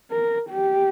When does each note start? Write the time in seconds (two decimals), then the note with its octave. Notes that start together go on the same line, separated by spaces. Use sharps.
0.11 A#4
0.50 G4